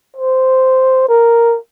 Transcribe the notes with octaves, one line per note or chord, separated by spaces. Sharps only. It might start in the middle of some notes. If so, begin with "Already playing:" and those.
C5
A#4